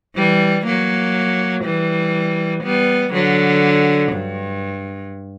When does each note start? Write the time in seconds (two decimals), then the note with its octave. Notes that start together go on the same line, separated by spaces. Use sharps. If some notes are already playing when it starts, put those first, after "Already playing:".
0.16 E3 G3
0.66 F#3 A#3
1.64 E3 G3
2.64 G3 B3
3.13 D3 F#3
4.12 G2